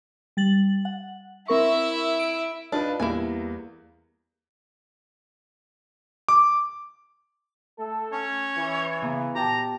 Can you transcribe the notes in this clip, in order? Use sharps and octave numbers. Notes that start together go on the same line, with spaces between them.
G3 A6 F#7
F#5
C4 E4 A#4 E5 C#6
D7
D4 D#4 F4 B4
F5
E2 G3 A#3 E4 G#5
D6
A3 A4
C#4 C#5
E3
C#3 B3 A#5
A#2 G4 G5 A5 A#5